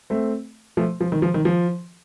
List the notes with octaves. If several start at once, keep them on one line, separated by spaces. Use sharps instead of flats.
A3 C4
F3 A3
F3
D#3
F3
D#3
F3